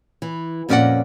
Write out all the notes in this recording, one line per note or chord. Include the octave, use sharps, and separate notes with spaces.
E3
F2 A#2 C#4 D5 D#5 F#5